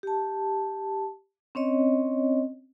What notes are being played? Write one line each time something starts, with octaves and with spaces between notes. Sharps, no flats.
G4 A5
C4 C#4 C#5 D#5